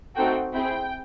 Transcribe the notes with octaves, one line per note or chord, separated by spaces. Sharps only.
A3 C4 D#4 F#4 A4 G5
C4 E4 G#4 G5